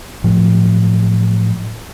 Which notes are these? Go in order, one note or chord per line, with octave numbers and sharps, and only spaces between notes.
A2 F3 F#3